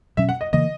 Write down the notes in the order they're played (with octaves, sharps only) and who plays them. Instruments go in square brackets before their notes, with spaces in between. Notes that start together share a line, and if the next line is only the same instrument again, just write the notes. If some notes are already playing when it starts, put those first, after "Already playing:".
[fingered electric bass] B2 F#3 C#4 [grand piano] E5
[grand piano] F#5
D#5
[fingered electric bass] C#3 E3 A#3 [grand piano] D#5